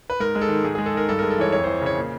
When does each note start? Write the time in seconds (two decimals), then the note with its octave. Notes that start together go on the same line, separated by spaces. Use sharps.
0.10 B4
0.20 G#2 A#4
0.35 G#3
0.41 A4
0.49 D#3
0.64 G#2 G#4
0.75 G#3 G#4
0.86 A4
0.94 D#3 A#4
1.09 G2 A4
1.19 G#3 A#4
1.30 A4
1.38 E3 C#5
1.52 F2 C#5
1.64 E3 C5
1.81 C#3 C#5
1.97 A#2